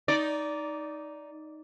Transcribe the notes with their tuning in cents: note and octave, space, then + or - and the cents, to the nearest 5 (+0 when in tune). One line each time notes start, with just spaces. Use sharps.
D#4 +0 D5 -15